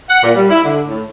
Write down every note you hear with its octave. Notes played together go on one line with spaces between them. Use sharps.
F#5
A#2
G3
E4
D3
A2